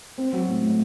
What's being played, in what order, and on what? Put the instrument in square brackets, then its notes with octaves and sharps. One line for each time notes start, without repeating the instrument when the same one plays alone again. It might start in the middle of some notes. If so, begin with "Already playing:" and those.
[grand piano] C4
F#3
A2
A2